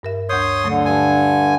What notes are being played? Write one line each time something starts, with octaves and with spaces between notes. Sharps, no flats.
G2 A#4 E5
D2 C#5 C6 D#6 G6
D3 F#3 A3
G2 G#5